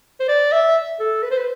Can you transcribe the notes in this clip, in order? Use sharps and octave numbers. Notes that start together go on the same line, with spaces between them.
C5
D5
E5
A4
B4
C5
B4